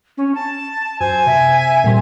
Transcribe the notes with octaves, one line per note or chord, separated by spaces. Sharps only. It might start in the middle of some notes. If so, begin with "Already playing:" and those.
C#4
A5
F#2 C5 G#5
C3 E5
A#2 G3 C4